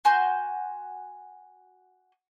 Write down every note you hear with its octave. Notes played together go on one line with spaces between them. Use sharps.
F#4 G#5 C6 G6